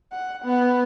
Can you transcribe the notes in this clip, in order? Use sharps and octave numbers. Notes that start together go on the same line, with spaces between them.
F#5
B3